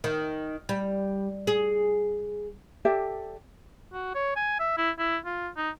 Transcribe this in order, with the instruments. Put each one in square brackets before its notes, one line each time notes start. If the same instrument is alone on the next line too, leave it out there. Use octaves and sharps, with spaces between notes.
[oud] D#3
G3
G#4
[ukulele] G4 A4 D5 E5
[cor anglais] F#4
C#5
G#5
E5
E4
E4
F4
D#4